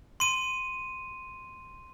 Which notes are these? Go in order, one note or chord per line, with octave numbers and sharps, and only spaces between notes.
C6 D#7